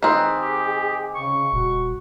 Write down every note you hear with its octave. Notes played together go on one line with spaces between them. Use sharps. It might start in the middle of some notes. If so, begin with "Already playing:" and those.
D#3 C4 G#4 B4
G4
C#3 C#6
D#1 F#4